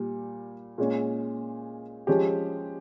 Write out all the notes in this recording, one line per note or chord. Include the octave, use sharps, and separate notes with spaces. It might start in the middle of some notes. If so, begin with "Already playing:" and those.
Already playing: A#2 G3
A#2 G#3 C#4
F3 G#3 C#4 G4